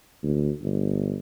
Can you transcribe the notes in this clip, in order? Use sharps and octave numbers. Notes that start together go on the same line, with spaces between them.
D2
G1